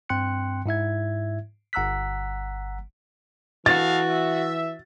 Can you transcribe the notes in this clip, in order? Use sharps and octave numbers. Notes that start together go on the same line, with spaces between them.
G2 C4 G5 C6 F#6 C#7
G#2 E4 E5 G#6
G1 F#5 A#5 E6 F#6 B6
E3 B3 F#4 A4 F5 A6
E5